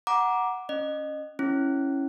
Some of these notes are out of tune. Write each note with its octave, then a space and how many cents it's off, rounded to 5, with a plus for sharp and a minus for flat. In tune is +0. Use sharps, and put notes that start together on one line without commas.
F#5 +0 A#5 +20 D6 +0
C#4 +0 D#5 -25
C#4 -10 E4 +0